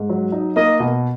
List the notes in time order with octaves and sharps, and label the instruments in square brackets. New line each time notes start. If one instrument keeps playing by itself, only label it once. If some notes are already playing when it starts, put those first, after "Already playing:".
Already playing: [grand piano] G#2
F#3
D#4
[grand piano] A#3 [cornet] D#5
[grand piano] B2